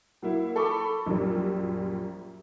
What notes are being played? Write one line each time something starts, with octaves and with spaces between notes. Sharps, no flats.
F#3 A#3 E4
A4 B5 C#6 D6
A#1 F#2 G3